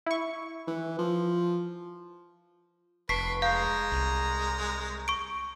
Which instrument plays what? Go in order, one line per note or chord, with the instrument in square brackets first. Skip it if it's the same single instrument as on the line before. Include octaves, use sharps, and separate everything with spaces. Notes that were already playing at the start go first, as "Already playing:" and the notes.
[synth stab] E4 C#6
[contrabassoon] E3
F3
[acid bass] F1 [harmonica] B4 [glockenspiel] A5 C#6 D7 [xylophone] B6 C7
[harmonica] G#3 A#5 [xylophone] F5 [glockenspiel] G6 C7
[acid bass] C2
[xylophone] C#6 D7